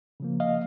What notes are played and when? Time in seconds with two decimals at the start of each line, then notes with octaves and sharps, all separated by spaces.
0.20 C#3 F3 A#3
0.40 D#5 F5